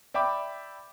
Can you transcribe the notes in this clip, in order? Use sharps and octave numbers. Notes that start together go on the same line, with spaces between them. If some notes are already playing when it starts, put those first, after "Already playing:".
D5 E5 G5 B5 D6